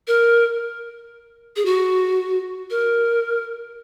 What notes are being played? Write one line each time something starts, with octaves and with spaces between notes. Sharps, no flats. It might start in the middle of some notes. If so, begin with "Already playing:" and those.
A#4
G#4
F#4
A#4